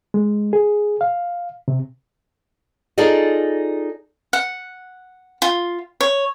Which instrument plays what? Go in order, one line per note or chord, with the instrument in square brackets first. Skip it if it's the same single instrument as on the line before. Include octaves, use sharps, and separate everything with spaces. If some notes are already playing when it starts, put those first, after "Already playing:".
[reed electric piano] G#3
G#4
F5
C3
[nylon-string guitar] D#4 F4 G#4 A4 D5 D#5
[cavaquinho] F#5
F4
C#5